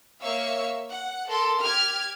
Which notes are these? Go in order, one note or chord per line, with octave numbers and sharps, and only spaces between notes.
A#3 C#5 E5 F5 C#6 E6
F#5
A4 A#4 C6
G4 F6 G#6